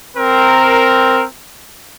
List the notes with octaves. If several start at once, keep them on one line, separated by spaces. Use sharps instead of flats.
C4 A#4